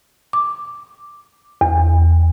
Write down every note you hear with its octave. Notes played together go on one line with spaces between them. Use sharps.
D6
E2